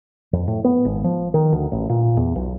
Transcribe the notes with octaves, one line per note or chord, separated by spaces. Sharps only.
F2
A2
B3
G#1
F3
D#3
D2
A1
A#2
E2
B1